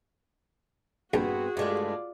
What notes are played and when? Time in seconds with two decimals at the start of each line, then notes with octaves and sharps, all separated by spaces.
1.14 A#1 G2 B3 C4 F#4 G#4
1.57 G2 G#3 A3 F4 D5